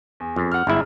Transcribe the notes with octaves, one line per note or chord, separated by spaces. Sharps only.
E2
F2
F#5 F6
G1 G#2 E4